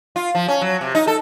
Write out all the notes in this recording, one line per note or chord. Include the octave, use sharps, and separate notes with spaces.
F4
F3
C#4
F#3
C3
D#4
A4